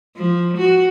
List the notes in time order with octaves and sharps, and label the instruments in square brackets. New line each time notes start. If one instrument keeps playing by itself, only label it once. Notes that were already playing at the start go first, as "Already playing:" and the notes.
[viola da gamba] F3
F#4